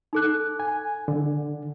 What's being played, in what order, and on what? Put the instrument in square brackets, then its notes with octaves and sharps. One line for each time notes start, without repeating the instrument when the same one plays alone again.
[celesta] D#4 A4 F#6
[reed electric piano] G#5
D3